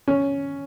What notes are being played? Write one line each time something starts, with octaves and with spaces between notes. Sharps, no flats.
C#4